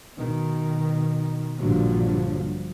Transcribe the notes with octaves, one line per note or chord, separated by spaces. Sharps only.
B2 D#3
A#1 G2 A#2 D3 F3 F#3